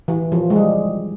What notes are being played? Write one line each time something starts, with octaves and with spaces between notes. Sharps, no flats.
E3
F3
G#3
G3